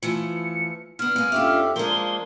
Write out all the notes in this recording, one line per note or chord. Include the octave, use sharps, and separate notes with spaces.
E3 F3 A3 C#7
D3 B3 F6
G#3 A#3
F2 C#4 D4 F4 G4 E5
F3 G#3 A#3 D4 A#4 G7